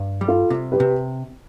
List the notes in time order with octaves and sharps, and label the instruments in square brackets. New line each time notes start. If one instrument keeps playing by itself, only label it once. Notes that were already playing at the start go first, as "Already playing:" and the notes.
Already playing: [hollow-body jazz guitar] G2
G3
[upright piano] F4 A4
[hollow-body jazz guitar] C3
[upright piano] G4 B4
[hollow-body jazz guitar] C3